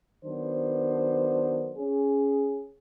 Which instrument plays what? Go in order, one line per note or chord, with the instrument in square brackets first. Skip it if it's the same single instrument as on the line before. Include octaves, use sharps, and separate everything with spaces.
[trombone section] D#3 F#3 B3 D4 C5
C#4 G#4